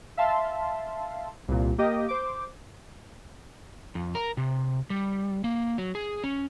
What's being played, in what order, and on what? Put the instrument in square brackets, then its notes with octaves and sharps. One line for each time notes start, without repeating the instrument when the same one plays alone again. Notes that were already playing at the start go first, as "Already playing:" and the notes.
[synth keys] E5 F5 A5 C6
C2 A#2
A#3 G4 D#5
C5 D6
[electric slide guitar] F2
A#4
C3
G3
A#3
F#3
G#4
C#4